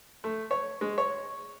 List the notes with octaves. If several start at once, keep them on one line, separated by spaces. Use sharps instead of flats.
A3
C#5
G#3
C#5